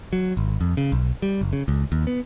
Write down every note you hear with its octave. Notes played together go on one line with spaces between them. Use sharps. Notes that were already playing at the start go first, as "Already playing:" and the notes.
F#3
G#1
F2
C#3
B1
G3
F#1
C#3
C#2
D#2
B3